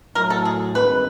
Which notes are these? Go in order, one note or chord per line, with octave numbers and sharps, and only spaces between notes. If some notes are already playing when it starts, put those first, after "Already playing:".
A2 F#3 A3 A#4
A4
G#4
G2 D#3 G#3 C4 B4